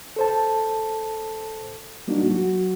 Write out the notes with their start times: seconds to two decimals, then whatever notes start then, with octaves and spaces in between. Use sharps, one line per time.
0.16 A4 C5 A5
2.08 G3 A#3 D4 D#4 F#4
2.30 F#3 F#4